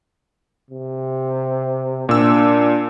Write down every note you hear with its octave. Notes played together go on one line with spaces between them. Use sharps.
C3
A#2 D4 E6